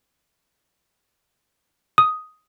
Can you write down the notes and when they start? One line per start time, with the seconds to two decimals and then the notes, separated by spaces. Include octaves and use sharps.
1.98 D#6